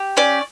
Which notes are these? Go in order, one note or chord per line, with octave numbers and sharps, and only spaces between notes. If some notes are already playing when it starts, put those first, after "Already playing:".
Already playing: G4
C#4 D5